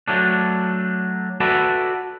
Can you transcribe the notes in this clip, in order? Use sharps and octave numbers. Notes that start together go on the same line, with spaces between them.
F#3 A3 D4
F#4 A4 B4 D5 E5